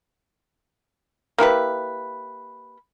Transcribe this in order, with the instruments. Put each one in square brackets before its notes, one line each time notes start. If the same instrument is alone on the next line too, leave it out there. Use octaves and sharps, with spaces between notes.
[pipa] A#3 E4 G4 B4